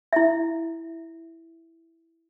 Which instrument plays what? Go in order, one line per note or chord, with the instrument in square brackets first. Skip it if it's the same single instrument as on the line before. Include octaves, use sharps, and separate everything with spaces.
[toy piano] E4 E5